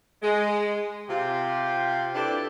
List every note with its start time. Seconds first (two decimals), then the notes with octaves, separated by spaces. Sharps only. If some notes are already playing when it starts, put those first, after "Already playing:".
0.22 G#3
1.08 C3 F4 G4
2.14 D4 E4 G4 A4 B4 D5